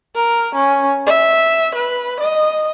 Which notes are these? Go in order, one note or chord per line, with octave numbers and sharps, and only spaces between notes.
A#4
C#4
E5
B4
D#5